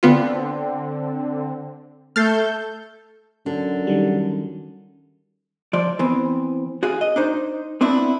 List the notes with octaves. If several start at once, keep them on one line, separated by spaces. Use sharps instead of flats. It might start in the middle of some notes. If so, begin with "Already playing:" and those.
D3 B3 C4 F4
A3 A4 F6 G6 A6 C7
F#2 D3
D#3 G3
F3 D5
E3 B3 C4
F#4 G#4 F5
D#5
D4 D#4 C5
B3 C4 D4 E4